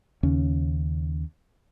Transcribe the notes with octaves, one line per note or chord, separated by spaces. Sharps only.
D#2 C#3 C#4